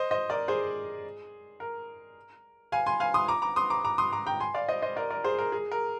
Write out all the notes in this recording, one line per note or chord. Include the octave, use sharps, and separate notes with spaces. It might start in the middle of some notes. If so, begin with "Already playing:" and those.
Already playing: C5 D#5
C5 D#5
A#4 D5
G#4 C5
A#4
F5 G#5
G#5 C6
F5 G#5
C6 D#6
A#5 D6
A#5 D6
C6 D#6
A#5 D6
A#5 D6
C6 D#6
A#5 D6
G5 A#5
G#5 C6
D5 F5
C5 D#5
C5 D#5
A#4 D5
A#4 D5
G#4 C5
A#4
G#4
A#4